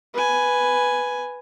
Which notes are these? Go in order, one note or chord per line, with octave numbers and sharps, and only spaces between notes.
B4 G#5